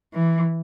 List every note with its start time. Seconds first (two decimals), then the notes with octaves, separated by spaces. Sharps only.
0.14 E3